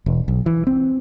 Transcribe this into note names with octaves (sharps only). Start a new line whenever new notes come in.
E1
B1
E3
C4